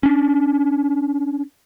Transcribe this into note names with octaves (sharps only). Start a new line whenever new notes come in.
C#4 D4